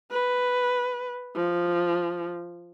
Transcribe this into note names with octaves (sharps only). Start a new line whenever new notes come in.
B4
F3